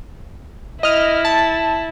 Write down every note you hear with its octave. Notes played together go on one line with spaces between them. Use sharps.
E4 D#5 F6
A5